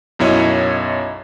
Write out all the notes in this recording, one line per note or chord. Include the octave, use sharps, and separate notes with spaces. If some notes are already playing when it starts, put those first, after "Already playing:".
B1 F#2 E4 C#5 D#5